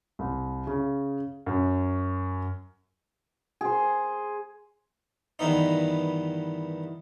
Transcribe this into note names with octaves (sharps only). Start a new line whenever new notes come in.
C2
C#3
F#2
G#4 C5
G2 D#3 E3 B3 D#4